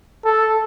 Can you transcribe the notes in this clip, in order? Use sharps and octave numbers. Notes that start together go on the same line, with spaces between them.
A4